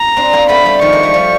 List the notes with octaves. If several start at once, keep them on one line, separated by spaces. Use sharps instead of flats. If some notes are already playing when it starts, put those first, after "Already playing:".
Already playing: A#5
C4 D4
A#3 C4
A3 B3 B5
G3 A3
D#3 F3 C#6
G#3 A#3
G3 A3
F3 G3